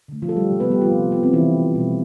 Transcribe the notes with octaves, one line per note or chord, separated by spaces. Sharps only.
D3 A3
F3 F4
A4
G3 G4
C3 G3
B3 B4
G3 G4
F3 F4
C3 G3
B3
C4
B2 E3 G3 E4
B2 G3